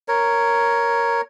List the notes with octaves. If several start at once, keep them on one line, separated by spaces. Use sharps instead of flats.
A#4 C#5